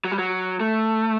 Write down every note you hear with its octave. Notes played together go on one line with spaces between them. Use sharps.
F#3
G3
F#3
A3